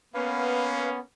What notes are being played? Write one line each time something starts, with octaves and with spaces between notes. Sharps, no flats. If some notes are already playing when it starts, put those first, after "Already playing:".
A#3 B3 C#4 B4 F5